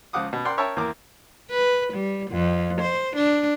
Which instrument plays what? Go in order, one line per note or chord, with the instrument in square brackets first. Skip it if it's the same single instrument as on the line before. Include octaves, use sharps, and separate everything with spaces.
[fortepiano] C#2 F3 F4 F#5 D6 D#6
B2
A#4 D5 F#5 G5 C6
A#4 C#5 E5 G5 A5
E2 A#3 A#4 D6
[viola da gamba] B4
G3
F2
C5
D4